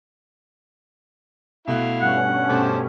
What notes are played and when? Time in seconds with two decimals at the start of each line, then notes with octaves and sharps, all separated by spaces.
1.68 B2 A3 E4 F5 F#6
2.01 G2 C#4 F#5
2.49 B2 A3 G4 C5 A5 D6